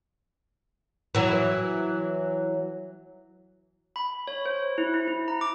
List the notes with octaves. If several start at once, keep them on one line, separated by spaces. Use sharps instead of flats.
E3 F#3
B5
C#5
C5
E4
E4
E4
A#5
D6